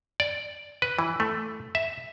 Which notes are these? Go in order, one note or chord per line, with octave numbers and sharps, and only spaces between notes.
D5
B4
E3
A3
E5